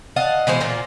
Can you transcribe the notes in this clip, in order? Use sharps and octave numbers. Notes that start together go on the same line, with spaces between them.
D#5 F5 F#5 A5
B2 E3 G#3 C5
A#2 A#3 F4